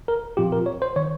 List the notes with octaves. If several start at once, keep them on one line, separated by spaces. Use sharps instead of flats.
A#4
A#2 F3 C4 F4 G4
A#4
C#5
C5
D#3 C#5